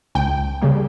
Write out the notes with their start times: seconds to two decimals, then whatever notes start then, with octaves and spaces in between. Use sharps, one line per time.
0.15 C#2 G5
0.61 C#3 G3 A#3